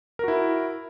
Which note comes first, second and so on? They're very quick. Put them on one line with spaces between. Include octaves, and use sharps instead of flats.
A#4 F#4 E4